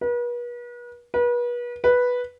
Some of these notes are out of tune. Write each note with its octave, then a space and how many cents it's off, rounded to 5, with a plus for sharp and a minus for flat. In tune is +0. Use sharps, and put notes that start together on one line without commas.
B4 -40
B4 -35
B4 -5